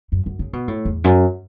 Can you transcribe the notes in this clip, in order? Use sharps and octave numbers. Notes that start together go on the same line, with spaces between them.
F#2
F#2
C#3
B2
A2
E2
F#2